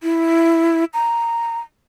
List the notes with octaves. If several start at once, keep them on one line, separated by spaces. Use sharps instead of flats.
E4
A#5